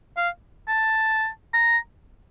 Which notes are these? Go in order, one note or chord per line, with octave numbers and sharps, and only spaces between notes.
F5
A5
A#5